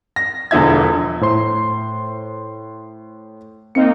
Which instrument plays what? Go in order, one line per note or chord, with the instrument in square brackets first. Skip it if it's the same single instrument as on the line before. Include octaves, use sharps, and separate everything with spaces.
[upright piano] A#6
E1 E2 D3 F3 E5 G#6
[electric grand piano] A2 C5 C6
[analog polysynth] A#3 C4 D#4 [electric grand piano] C#7